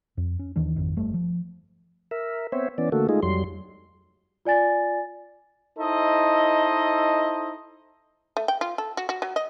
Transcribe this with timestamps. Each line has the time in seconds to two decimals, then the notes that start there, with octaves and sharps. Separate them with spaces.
0.17 F2
0.39 C#4
0.56 D#2 D#3 E3 D4
0.76 G#1 F2 D#3
0.96 G1 G3 A3
1.14 F3
2.11 A#4 E5
2.52 B3 C4 C5 C#5 E5
2.78 E3 B3 C#4 D5
2.92 D3 A3 A#3 F#4 A4
3.09 G#3 A3 D#4 F4 G#4
3.23 F2 F#3 G3 C6
4.45 F4 D5 G#5 A6
5.78 D#4 E4 A4 C5 D#5
8.37 A3
8.48 G5
8.61 F4
8.78 A4
8.97 F#4
9.09 F#4
9.22 F#3
9.36 D#5